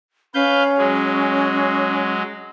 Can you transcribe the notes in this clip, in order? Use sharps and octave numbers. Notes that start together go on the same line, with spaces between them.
C#4 B4 F5 G6
F#3 G#3